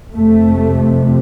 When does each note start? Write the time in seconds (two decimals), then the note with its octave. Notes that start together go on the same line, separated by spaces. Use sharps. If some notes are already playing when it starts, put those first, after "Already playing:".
0.14 F2 C3 A3